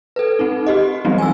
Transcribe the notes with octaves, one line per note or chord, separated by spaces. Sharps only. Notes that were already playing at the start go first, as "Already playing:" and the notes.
A4 B4
C4 D#4
F#4 G4 D#5
E3 F#3 G3 B3 C4 D#4
G#5 E6